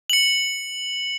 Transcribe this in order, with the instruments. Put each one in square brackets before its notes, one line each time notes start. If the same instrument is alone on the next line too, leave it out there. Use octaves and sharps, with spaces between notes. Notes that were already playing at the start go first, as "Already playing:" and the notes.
[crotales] C#7 F#7